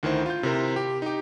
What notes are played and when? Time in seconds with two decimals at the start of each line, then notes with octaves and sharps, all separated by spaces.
0.03 D2 D#3 E4 C5
0.26 F4 G6
0.43 C3 E4 A#4 C5
0.76 G4
1.02 D#4 G4